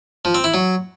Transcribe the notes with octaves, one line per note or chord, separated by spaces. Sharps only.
F3
C4
E4
F#3